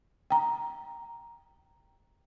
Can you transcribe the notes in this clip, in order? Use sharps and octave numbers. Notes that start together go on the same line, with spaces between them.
G5 A#5